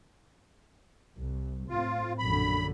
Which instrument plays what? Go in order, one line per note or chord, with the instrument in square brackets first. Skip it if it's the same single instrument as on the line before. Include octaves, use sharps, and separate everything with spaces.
[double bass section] C2
[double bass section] A2 C4 [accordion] F4
[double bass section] A#1 F#2 D3 [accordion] B5